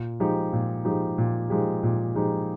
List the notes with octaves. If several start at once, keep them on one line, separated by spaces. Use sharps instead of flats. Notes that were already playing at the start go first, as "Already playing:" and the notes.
Already playing: A#2
F3 G#3 D#4 G4
A#2
F3 G#3 D#4 G4
A#2
F3 G#3 D#4 G4
A#2
F3 G#3 D#4 G4